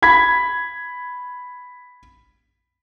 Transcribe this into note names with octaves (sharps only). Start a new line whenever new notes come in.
B5 G#6 B6